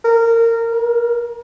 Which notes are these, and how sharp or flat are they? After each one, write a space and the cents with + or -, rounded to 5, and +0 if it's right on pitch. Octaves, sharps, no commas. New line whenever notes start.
A#4 -20
A#4 +35